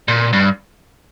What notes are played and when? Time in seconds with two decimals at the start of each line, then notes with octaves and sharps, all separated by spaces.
0.08 A#2
0.33 G2